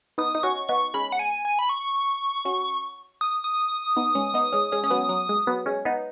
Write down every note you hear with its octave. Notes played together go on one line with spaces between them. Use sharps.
B3 D#4 D#6
D#4 D#6
C#4 F#4 C#6
B3 D#4 C#6
G#3 C#4 B5
F#5
G#5
G#5
B5
C#6
C#4 F#4
D#6
D#6
B3 D#4
G#3 C#4
B3 D#4
G#3 C#4
G#3 C#4
C#4
F#3 B3
F#3
G#3
F#3 B3
G#3 C#4
B3 D#4